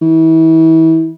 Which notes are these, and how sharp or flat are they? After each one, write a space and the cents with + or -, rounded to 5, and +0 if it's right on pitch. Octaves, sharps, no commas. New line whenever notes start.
E3 -35